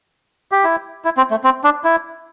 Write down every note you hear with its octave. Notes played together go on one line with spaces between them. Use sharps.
G4
E4
E4
C4
A3
C4
D4
E4